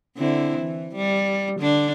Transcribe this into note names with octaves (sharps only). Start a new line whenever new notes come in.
D3 C4 E4
E3
G3
D3 D4